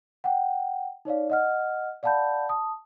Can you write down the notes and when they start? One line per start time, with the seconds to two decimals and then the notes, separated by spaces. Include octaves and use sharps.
0.24 F#5 G5
1.05 D#4 C#5 D5 F5
1.30 D#5 F#5 F6
2.03 D5 F5 F#5 A5 B5 G6
2.49 A5 D#6